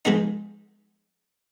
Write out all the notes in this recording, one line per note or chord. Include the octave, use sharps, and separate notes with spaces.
F3 G#3 B3 D#4